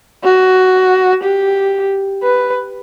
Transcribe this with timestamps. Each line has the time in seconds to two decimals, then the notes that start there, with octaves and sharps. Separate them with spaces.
0.24 F#4
1.24 G4
2.23 B4